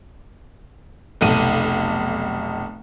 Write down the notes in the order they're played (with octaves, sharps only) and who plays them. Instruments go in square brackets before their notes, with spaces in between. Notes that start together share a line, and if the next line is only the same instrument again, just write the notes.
[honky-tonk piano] F1 B1 D#7